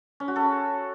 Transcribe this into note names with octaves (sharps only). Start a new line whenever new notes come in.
C#4
F#4
A4